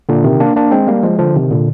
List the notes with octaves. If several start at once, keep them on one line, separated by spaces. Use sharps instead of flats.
A#2 D3
C3 D#3
A#3 D4
A#3 D4
G#3 C4
G3 A#3
F3 G#3
D3 F3
C3 D#3
A#2 D3